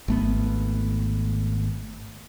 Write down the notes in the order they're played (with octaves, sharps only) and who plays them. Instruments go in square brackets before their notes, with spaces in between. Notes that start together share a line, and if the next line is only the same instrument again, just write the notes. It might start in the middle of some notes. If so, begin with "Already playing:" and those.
[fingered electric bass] G#1 A3 B3